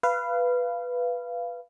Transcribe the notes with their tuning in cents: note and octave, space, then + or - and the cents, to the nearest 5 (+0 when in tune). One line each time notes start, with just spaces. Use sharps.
B4 +0 F5 -20